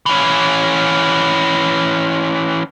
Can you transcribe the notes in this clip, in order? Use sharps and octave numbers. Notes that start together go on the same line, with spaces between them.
E3 C#4